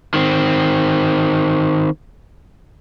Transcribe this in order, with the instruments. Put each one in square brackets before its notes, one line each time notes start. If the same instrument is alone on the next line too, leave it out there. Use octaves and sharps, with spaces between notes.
[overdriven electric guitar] D#3 C4